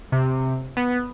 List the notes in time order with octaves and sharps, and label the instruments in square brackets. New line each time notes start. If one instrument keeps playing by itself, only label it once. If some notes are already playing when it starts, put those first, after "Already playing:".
[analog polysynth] C3
B3